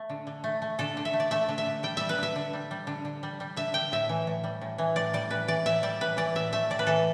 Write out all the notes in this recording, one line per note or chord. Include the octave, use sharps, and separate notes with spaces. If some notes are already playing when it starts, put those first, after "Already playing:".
Already playing: A3
D3
D3
A3
A3
D3 A4
D3
E5
A3
D5
A3 E5
D3
E5
D3
G3 G5
G3 E5
B4
D3 E5
D3
G3
G3
D3
D3
G3
G3
D3 E5
D3 G5
A2 E5
E3
A2
G3
A2
E3
A2 D5
G3 D5
A2 B4
E3 D5
A2 E5
G3 D5
A2 B4
E3 D5
A2 E5
A3 E5
A2 D5
B4
E3 A4